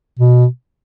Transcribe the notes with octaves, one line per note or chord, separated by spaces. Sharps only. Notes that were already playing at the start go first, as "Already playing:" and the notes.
B2